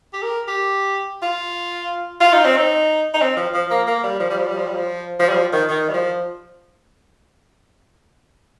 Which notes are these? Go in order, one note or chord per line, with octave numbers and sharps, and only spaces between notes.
G4
A#4
G4
F4
F4
D#4
C4
D#4
D#4
C4
F3
F3
A#3
A#3
G3
F3
G3
F3
G3
F3
G3
F3
F3
G3
F3
D#3
D#3
G3
F3